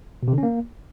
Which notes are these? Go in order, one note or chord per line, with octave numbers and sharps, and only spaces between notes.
B2
C3
D3
C#4
A#3